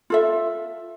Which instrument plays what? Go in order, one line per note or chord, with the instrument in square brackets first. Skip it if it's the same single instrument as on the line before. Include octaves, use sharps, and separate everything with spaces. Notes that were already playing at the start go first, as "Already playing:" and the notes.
[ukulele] F4 A4 E5